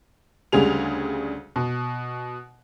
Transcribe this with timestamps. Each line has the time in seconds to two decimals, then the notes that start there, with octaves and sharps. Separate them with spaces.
0.52 D2 C#3 G3 G#4 F7
1.56 B2